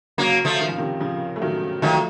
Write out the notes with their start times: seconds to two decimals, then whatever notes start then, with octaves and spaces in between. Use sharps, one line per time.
0.18 C#3 F#3 A#3
0.45 F3 A3
0.59 D#3
0.68 F3
0.78 C3 D#3
1.00 C#3 F3
1.36 A3
1.42 D#3 F#3
1.82 D#3 F3 F#3 A3